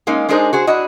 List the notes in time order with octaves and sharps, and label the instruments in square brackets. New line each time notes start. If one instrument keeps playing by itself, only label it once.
[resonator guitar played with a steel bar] G#3 A#3 C#4 D#4
G#3 D4 D#4 G#4 A#4 C5
F#4 G#4 C5
D4 E4 F#4 D#5